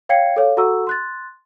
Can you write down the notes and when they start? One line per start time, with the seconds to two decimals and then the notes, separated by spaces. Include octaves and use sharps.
0.09 C#5 F5 G5 G#6 C7 C#7
0.36 A4 C#5 F5
0.57 F#4 A4 F#5 A#5 C#6 E6
0.87 C6 F#6 A6